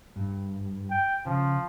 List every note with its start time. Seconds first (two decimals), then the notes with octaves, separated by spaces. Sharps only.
0.16 G2
0.90 G5
1.26 C#3 F3